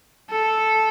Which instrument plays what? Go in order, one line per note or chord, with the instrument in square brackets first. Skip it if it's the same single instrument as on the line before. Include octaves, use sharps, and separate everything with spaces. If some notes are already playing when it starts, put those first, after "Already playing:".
[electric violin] A4